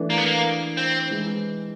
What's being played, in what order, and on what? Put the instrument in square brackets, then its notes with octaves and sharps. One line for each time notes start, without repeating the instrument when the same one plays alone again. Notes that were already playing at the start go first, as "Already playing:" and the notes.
Already playing: [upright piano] E3 A3 D4
[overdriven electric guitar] A#3
B3
A#3
C4
[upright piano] E3 G#3